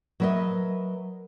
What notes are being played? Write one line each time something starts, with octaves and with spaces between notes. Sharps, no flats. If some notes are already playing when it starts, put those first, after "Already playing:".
F#3 A#4 B4 C#5 D#5 E5